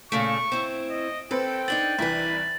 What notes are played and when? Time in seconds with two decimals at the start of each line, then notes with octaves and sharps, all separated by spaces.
0.12 A#2 C#3 A3 C#6 D7
0.52 C4 E4
0.90 D#5
1.31 C4 A4 B4 C5 G5
1.68 B3 D4 D#4 A6 F#7
1.99 C2 E3 E4 B4